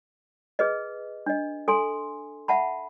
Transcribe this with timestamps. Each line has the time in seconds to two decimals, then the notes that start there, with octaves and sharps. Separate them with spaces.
0.59 G#4 B4 D#5
1.26 D4 D#5
1.68 A4 G#5 C6
2.48 E5 F#5 A5 B5